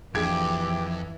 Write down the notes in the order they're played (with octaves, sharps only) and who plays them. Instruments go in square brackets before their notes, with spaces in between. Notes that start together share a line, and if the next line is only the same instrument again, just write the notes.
[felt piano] A#1 G#4 G#6 [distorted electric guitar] F2 [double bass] E3 [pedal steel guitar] G4